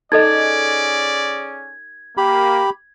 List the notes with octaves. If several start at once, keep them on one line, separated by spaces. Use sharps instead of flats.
C#4 D#4 G#4 A4 D5 D#5 G#6
A#3 G4 B5